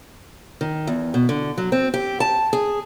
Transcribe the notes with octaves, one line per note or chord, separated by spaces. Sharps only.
D#3
E2
B2
D3
F#3
C4
G4
A5
G#4